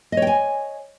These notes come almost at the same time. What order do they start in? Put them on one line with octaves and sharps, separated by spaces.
D#5 C#5 G5 G#5